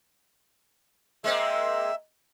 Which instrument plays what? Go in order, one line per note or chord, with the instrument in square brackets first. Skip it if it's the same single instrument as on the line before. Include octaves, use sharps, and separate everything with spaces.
[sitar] G#3 A#3 C4 [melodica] E5